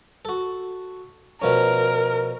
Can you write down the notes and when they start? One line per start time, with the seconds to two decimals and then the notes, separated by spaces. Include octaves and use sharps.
0.25 F#4 A4
1.42 B2 F3 C#4 A#4